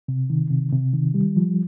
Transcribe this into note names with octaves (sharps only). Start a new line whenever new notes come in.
C3
D#3
C3
C3
D#3
G3
F3